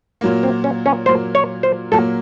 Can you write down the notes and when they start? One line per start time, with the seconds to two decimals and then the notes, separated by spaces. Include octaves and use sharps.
0.21 A#2 F#3 A#3
0.43 C4
0.64 C#4
0.86 C#4
1.06 A#2 F#3 A#3 C5
1.35 C#5
1.63 C5
1.92 A#2 F#3 A#3 A4